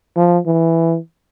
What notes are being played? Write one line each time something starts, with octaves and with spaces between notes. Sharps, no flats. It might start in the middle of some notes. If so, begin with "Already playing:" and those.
F3
E3